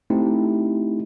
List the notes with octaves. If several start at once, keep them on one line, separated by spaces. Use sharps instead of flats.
A3 C4 D#4 E4 G4